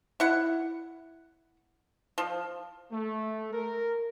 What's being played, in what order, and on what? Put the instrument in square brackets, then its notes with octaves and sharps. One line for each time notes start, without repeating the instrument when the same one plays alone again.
[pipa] E4 F#5
F3
[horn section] A3
A#4